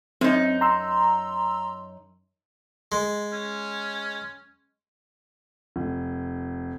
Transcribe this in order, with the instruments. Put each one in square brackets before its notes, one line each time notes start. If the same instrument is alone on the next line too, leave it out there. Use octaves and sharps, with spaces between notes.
[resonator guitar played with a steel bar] F#2 D#4 [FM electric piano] C4
[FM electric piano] A#5 C6 E6
[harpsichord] G#3
[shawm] C#4
[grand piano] F1